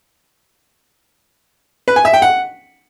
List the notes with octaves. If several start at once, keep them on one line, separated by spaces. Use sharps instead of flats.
B4
G#5
E5
G5
F#5